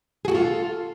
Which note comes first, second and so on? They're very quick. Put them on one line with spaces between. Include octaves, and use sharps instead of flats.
G#4 F#4 A4 F4